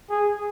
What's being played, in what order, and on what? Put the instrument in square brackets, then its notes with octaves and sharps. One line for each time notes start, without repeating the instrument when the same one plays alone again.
[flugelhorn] G#4